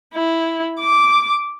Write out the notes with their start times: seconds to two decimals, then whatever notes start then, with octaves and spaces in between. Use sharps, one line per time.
0.14 E4
0.80 D6